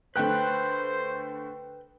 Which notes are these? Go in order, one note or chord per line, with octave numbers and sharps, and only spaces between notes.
D3 A3 B4 C5 G5 F#6